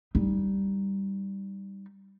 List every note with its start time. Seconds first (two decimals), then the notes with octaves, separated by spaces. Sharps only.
0.15 G3 D#4